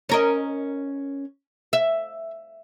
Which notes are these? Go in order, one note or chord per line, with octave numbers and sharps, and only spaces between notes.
C#4 A#4 D#5
E5